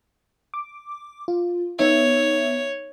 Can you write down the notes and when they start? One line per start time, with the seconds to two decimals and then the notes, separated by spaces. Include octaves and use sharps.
0.54 D6
1.28 F4
1.79 B3 D#4 C#5 E5